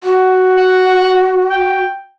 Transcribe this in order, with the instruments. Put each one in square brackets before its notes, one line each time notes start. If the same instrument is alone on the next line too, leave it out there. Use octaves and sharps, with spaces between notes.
[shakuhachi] F#4
[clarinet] F#5
G5